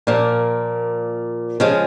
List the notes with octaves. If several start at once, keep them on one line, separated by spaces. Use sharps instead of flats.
A#2 F3 A#3
C#3 F3 G#3